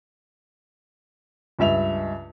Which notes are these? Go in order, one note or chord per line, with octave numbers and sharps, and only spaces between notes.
C#2 G2 E5 F7